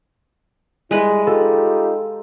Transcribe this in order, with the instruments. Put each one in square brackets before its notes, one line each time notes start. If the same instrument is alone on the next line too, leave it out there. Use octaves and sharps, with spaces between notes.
[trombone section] G3 E4 [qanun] G#3 B4 B5
[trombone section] D#4 F4 G4 [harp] A4